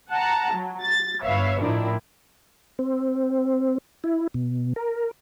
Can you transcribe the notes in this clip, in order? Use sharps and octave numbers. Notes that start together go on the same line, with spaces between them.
F#5 A5 A#5
F#3
A6
G1 B4 C#5 E5 F5
A2 D#3 F3 D4 E4
C4
E4
B2
A#4